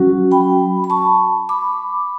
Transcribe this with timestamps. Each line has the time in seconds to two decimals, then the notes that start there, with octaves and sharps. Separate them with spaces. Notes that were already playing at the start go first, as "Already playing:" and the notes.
Already playing: F#3 C#4 F#4
0.31 G5 B5
0.84 B5
0.90 A5 C#6
1.49 B5 D6